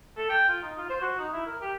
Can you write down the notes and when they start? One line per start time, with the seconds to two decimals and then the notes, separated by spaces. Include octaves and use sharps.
0.17 A4
0.29 G5
0.48 F4
0.62 D#4
0.78 F4
0.89 C5
1.01 F#4
1.19 D#4
1.33 E4
1.47 A#4
1.61 G4